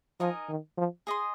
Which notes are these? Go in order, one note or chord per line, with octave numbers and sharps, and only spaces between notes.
F3 D#4 A#4 D#5 G#5
D#3
F3
G#4 D#5 C6